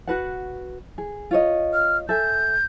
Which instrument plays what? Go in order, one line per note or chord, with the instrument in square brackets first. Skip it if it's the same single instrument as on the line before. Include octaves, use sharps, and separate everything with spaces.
[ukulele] F#4 B4 F#5
G#4
F4 C#5 D#5
[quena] F6
[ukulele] A4 E5 G#5 [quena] G6